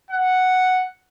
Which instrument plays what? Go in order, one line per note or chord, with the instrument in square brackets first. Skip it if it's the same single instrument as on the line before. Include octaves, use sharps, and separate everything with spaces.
[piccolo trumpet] F#5